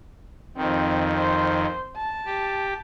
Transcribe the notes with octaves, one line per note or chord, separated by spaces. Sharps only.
F2 D#3 C4
C5
A5
G4